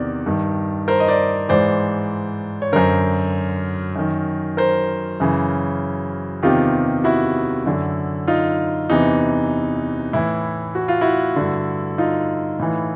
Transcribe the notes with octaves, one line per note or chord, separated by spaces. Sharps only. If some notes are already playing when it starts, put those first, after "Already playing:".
Already playing: E2 C3 D#3 D5
G2 D#3
A#4 C5
D#5
C5 D5
G#2 E3 C5 D5
C#5
F#2 D3 A#4 C5
F#2 D#3
A#4 C5
F#2 C#3 E3
E2 C3 D#3 F4 G4
E4 F#4
F#2 D3
D#4 F4
E2 C3 E3 D#4
A2 E3 E4
F#4
F4
E4 F#4
G2 D3
D#4 F4
A2 E3